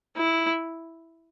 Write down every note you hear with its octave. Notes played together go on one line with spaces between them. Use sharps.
E4